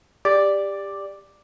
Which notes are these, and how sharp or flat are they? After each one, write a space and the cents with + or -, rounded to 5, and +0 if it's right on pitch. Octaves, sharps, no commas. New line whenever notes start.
G4 +20 D5 +0